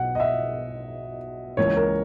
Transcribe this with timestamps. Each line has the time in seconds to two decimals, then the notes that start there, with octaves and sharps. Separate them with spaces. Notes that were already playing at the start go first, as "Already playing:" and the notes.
Already playing: B1 B2 F#5
0.15 D#5
0.20 E5
1.57 C#2 C#3 E3 A#3 C#5
1.77 A#4